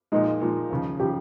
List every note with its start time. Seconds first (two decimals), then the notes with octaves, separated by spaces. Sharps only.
0.12 A#2 F3 G#3 D#4
0.41 A#2 F3 G#3
0.71 D#2 C#3 F3
1.00 C#3 F3 G4